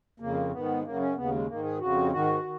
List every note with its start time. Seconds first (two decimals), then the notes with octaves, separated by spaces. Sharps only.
0.20 F2 C#3 A#3
0.51 G#2 D#3 B3
0.83 F#2 C#3 A#3
0.99 C#4
1.15 D#2 C#3 B3
1.31 G#3
1.47 G#2 D#3 A#3
1.63 G#4
1.79 F2 C#3 F#4
2.11 G#2 D#3 F#4
2.43 D#3